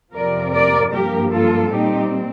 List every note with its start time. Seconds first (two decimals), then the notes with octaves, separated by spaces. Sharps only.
0.13 F2 C3 F3 C4 A#4 D5
0.53 A#4 D5
0.92 G2 F3 A#3 G4 A#4
1.32 F4 A4
1.71 A#2 G3 C4 D#4 G4